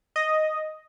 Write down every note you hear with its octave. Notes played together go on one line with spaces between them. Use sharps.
D#5